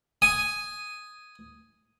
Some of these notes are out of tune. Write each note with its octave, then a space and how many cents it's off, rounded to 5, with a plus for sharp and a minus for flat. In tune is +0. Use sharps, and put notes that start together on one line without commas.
G#5 +0 D#6 +0